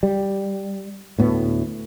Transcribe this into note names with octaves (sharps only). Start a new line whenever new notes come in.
G3
D2 A2 B3